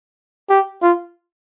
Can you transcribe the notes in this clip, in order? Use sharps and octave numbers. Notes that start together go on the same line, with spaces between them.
G4
F4